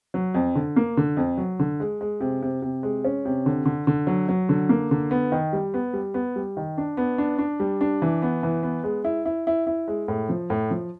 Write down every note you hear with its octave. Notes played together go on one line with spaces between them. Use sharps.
F#3
F2
D3
A#3
D3
F2
F#3
D3
G#3
G#3
C3
C3
C3
G#3
C#4
C3
D3
D3
D3
F#3
F#3
D3
A#3
D3
B3
D#3
G3
B3
G3
B3
G3
D#3
D4
B3
D4
D4
G3
D4
E3
B3
E3
B3
G#3
E4
E4
E4
E4
G#3
A2
F3
A2
F3